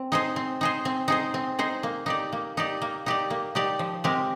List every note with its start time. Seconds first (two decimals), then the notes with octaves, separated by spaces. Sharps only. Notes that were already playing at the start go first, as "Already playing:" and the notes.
Already playing: C4
0.12 D#4 G#4 C5
0.36 C4
0.61 D#4 G#4 C5
0.85 C4
1.08 D#4 G#4 C5
1.34 C4
1.59 D#4 G#4 C5
1.83 A#3
2.06 D#4 G4 D5
2.32 A#3
2.57 D#4 G4 D5
2.82 A#3
3.06 D#4 G4 D5
3.30 A#3
3.55 D#4 G4 D5
3.79 F3
4.04 G#3 C4 G4 A#4